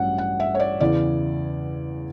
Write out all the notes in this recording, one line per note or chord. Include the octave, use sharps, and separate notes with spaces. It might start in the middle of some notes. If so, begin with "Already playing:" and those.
Already playing: A1 G2 F#3 C#4 F#5
F#5
E5
C#5
D5
E2 C#3 E3 D5